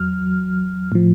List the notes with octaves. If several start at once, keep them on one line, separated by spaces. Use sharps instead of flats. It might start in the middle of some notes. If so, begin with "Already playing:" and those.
Already playing: E2 F#3 F6
A2 F3